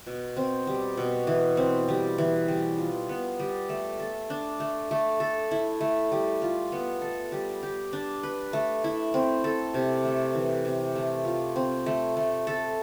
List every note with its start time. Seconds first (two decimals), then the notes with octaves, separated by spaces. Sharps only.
0.06 B2
0.37 C4
0.67 G3
0.97 B2
1.27 E3
1.57 C4
1.89 G3
2.18 E3
2.48 G3
2.78 F4
3.09 B3
3.39 G3
3.69 A3
4.00 A4
4.30 D4
4.60 A3
4.91 A3
5.20 A4
5.51 E4
5.81 A3
6.12 G3
6.42 F4
6.72 B3
7.02 A4
7.32 G3
7.63 G4
7.93 D4
8.23 B4
8.53 A3
8.84 E4
9.14 C4
9.44 A4
9.74 C3
10.05 A3
10.35 E3
10.65 C3
10.95 A3
11.25 F4
11.56 C4
11.86 A3
12.17 A3
12.47 A4